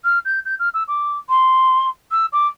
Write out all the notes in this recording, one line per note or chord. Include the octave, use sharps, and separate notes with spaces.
F6
G6
G6
F6
E6
D6
C6
E6
D6